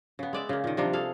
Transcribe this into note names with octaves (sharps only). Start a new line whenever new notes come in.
C#3 B3
G#3 D5 E5
C#3 A#3
A#2 D#3
C3 F3 G3 D4
G#4 A4 F5